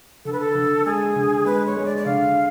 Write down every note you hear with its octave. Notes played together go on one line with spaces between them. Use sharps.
D3 A4
B4
A4
D3
G#3 G#4
D3
G#3 B4
C#5
G#3
D5
D5
D3 F5